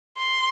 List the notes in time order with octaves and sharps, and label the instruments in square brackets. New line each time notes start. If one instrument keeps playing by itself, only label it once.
[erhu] C6